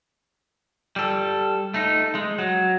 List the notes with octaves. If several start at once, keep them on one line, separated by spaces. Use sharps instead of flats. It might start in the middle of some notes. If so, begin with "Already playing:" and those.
G3 A4
A3 D#4
G#3
F#3